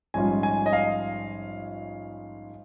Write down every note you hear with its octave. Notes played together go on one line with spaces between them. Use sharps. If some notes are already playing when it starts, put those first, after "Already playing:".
A#1 G#2 G3 C#4 F4 G#5
G#5
D#5
F5